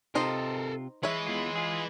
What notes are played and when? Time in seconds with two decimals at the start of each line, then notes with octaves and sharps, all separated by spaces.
0.15 C3 D#4 F4 A4 A#4 C5 D#5
1.03 E3 G#3 B4 C#5 E5
1.27 E2 F4
1.55 F4 G#4